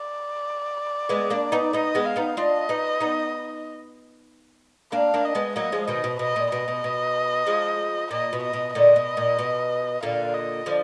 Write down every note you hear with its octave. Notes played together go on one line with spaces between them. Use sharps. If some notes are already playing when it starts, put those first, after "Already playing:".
Already playing: D5
G#3 B3
A#3 D4
B3 D#4
B3 D#4 D#5
G#3 B3
F5
B3 D#4
D4 F4 D#5
B3 D#4
B3 D#4
A#3 D4 F5
A#3 D4
D#5
G#3 B3
F#3 A#3 D#5
F3 G#3
B2 D#3 D#5
B2
B2 D#5
A#2
B2 D#5
B2
B2
F3 G#3
A#2 D#5
B2
D#5
B2
A#2 D3 D#5
B2
A#2
B2
A#2 D3 F5
D#5
D3 F3